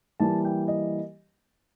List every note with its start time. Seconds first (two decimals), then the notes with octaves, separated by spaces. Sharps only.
0.20 E3 G3 A#3 A5
0.45 G5
0.68 D#5